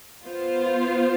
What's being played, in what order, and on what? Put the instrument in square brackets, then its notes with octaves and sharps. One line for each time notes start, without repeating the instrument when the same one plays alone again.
[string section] B3 F4 C5